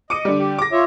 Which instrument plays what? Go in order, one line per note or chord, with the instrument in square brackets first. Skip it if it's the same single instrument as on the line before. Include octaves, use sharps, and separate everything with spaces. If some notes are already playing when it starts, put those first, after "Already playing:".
[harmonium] D#5 [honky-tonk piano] D6 C#7 D#7
[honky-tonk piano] D3 G3
[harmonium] G4
[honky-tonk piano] D6 A#6
[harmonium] F4 C#5 E5